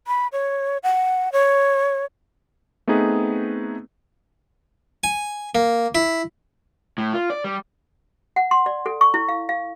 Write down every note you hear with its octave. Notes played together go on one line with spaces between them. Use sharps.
B5
C#5
F#5
C#5
A3 B3 C4 D#4 G#4 B4
G#5
A#3
E4
A2
F4
D5
G3
F#5
C6
D5
A4
C#6
E4
F5
F5